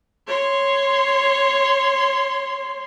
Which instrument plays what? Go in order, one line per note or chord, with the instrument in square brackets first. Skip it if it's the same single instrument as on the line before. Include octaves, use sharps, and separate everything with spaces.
[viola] C#5 C6